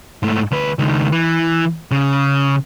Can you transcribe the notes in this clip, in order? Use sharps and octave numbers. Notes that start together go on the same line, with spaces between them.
G#2 A3
D2 B4
C#2 D#3
E3
C#3